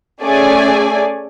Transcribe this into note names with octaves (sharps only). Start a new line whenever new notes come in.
A3 C#4 G#4 D5 G#5